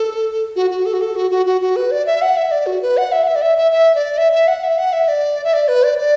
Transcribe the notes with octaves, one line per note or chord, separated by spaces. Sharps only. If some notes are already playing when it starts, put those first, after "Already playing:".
Already playing: A4
F#4
F#4
A4
F#4
A4
F#4
F#4
F#4
F#4
B4
D5
E5
F#5
E5
D5
F#4
B4
F#5
E5
F#5
E5
D5
E5
E5
E5
D5
E5
E5
F#5
E5
F#5
E5
D5
E5
D5
B4
D5
D5